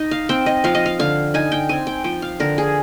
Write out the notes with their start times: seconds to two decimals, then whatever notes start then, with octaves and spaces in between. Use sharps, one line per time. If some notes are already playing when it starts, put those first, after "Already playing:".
Already playing: D#4 D#5
0.11 F5
0.29 C4 G5
0.46 D#5
0.64 F3 F5
0.75 D#5
0.86 F5
0.99 D3 F5
1.34 D#4 G#5
1.52 G5
1.69 C4 G#5
1.87 G5
2.04 F3 G5
2.22 F5
2.40 D3 A#4
2.58 G#4